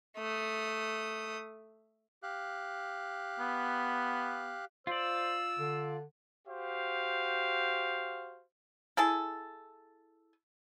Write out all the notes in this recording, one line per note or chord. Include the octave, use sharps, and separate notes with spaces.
A3 D#6
G4 F5 F#6
B3
F4 C5 D5 E6
D3
F#4 G4 C5 F5
E4 G#4 A4